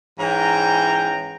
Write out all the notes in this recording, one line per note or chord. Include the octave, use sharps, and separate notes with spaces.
G#2 E3 C#4 G5 A#5